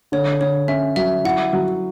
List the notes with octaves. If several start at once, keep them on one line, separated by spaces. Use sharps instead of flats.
D3 C#5
D3 C#5
C#4 E5
F#3 E5
E4 F#5
F#3